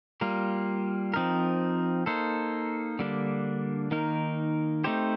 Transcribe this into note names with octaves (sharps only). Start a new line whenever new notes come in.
G3 A#3 F4 A#4
F3 C4 D#4 A#4
A#3 D#4 A4 C5
D3 G3 A#3 D4
D#3 A#3 D#4 A#4
A3 C4 D#4 G4 C5